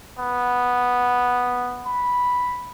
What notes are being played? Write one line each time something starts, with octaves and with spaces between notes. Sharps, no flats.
B3
B5